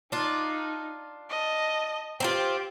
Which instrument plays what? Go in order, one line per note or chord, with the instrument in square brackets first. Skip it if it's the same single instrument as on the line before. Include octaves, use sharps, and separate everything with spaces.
[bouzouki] D4 F4 [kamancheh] D#4
[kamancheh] D#5 A5
[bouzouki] C4 D#4 F4 [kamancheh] G4